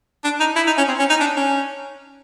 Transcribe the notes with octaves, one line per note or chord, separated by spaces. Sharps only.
D4
D#4
E4
D#4
C#4
C4
C#4
D#4
D4
C#4